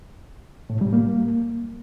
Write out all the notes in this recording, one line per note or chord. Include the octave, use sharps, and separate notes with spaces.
A2
G3
A#3